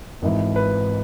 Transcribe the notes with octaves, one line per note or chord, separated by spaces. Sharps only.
G#1 G#2 E3
B4